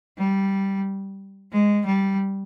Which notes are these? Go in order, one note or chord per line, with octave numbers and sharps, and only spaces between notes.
G3
G#3
G3